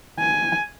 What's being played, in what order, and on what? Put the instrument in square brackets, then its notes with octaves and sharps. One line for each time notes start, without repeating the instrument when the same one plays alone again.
[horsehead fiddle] G#5